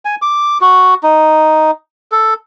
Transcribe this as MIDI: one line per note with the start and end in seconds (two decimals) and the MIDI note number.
0.05 0.15 80
0.22 0.58 86
0.61 0.94 66
1.03 1.71 63
2.12 2.34 69